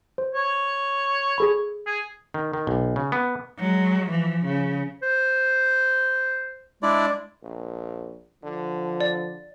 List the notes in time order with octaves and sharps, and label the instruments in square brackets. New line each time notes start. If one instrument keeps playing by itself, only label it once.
[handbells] C5
[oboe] C#5
[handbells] G#4 A4 B5
[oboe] G#4
[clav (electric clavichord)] D#3
D#3
B1
C#3
B3
[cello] F#3 G#3
E3 F3
C#3
[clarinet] C5
[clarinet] G#3 [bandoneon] D4 E4 D5
[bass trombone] A#1
[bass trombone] D3 [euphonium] F3
[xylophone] D5